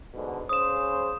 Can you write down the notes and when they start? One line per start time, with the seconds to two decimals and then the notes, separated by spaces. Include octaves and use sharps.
0.14 G#2 B2 D3
0.49 C#3 C5 D#6 E7